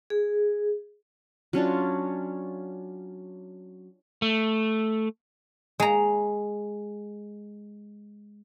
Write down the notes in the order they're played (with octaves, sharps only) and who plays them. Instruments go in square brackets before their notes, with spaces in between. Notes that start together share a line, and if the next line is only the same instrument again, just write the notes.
[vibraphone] G#4
[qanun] F#3 C#4 D4 F4
[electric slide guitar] A3
[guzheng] G#3 A#5